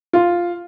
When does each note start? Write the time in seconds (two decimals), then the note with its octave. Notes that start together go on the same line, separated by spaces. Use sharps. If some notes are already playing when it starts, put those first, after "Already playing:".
0.13 F4